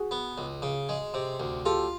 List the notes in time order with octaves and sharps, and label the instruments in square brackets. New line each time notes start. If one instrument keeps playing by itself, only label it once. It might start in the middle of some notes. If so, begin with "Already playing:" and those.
Already playing: [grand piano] F#4 G#4
[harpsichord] B3
C#2
C#3
G#3
C3
D2
[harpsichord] F4 [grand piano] G4 A4